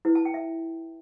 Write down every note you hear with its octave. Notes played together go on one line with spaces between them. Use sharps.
E4 B4
A5
G5
E5